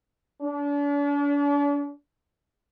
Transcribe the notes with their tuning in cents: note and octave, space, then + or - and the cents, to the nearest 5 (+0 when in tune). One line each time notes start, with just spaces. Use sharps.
D4 -40